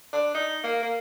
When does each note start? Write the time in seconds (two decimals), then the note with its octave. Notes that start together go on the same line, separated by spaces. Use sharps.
0.13 D4
0.34 D#4
0.64 A#3
0.83 A#3